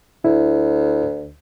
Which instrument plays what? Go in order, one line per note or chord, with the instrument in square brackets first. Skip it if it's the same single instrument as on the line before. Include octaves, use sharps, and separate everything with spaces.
[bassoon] D2 [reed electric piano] E4